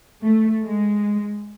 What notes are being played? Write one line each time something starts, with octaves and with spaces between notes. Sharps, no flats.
A3
G#3